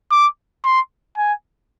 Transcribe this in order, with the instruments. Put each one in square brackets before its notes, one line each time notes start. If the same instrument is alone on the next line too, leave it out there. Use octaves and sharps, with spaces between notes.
[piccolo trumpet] D6
C6
G#5